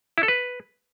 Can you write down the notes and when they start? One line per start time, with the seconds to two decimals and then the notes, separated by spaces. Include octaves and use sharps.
0.18 E4
0.23 A4
0.28 B4